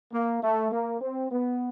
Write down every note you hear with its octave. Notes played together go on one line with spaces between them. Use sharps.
A#3
A3
A#3
C4
B3